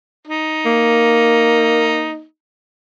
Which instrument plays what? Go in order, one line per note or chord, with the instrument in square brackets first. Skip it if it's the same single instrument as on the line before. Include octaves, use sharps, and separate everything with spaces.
[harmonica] D#4
[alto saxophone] A#3